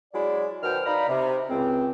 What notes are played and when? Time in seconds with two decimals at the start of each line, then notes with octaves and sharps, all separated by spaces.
0.13 F#3 G#3 C#4 E4 D5
0.63 B2 D#3 F#3 C5 G5 F6
0.86 D#4 D5 F5 A#5 B5
1.09 C3
1.49 C#2 C4